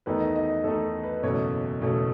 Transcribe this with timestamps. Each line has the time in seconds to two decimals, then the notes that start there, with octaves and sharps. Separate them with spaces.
0.06 E2 D#3 A3 D#4 B4
0.20 D#5
0.36 D#5
0.64 E2 D#3 A3 D#4 A4
1.03 B4
1.23 F#1 E2 B2 A3 C#5
1.81 F#1 E2 B2 A3